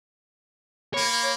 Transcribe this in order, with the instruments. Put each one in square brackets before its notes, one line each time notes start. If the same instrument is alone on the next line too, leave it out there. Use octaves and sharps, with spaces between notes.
[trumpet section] A#3 [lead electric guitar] C#5 [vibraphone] B5